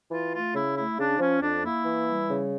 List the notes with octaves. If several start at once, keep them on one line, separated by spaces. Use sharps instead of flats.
E3 F4
A3 F4
C#3 E4
A3 E4
C#3 D4
F3 C#4
F2 D4
A#3 E4
E3
G3
C#3